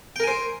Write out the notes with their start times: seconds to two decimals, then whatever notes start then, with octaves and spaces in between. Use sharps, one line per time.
0.16 G5
0.20 A#4
0.24 G#5
0.27 C5